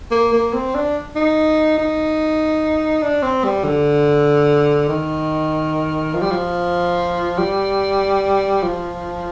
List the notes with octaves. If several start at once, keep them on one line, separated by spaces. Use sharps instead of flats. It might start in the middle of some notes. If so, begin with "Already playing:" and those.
A#3
A#3
C4
D4
D#4
D#4
D4
C4
G3
D3
D#3
F3
G3
F3
G3
F3